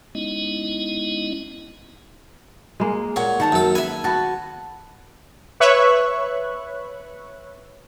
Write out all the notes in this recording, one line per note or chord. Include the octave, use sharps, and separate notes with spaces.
G#3 B3 C#4 D#4 E4 D#5
G#3 A#3
A#2 C#5 F#5
D#3 F#5 A5 A#5
F#2 A4
B4 E5 G#5
B3 F#4 F#5 A5
B4 C#5 E5 C#6 F#6